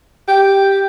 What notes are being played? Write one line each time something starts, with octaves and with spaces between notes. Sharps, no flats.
G4